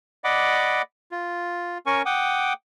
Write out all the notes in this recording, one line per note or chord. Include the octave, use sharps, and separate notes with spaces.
D5 D#5 F#5 B5 D6
F4
C#4 A#4 G#5 C#6
F#5 G5 D6 D#6